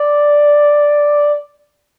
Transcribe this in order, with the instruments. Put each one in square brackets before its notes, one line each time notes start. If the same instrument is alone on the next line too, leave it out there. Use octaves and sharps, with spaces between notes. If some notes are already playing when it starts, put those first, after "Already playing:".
Already playing: [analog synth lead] D5